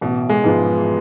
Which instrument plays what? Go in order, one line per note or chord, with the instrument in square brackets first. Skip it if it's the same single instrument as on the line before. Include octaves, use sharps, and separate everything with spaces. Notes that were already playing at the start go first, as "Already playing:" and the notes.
[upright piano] A1 [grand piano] B2
[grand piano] G#3
[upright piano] G#2 F3 B3 F4